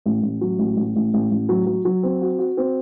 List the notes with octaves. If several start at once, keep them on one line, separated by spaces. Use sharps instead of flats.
A1
A1
F#3
A1
A1
A1
A1
A1
F#3
F#3
F#3
C4
F#4
F#4
C4